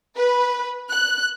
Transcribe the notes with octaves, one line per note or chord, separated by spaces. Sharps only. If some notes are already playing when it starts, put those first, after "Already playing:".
B4
F#6